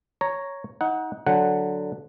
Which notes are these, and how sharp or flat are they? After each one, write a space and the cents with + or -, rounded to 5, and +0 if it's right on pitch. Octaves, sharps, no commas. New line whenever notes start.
C#5 +0 A#5 +0
D#4 +25 F#5 +0
D3 +0 F#3 +0 F#5 +0